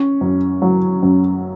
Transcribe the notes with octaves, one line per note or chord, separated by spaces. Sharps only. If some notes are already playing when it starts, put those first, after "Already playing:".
Already playing: C#4
F#2
F#3
F#2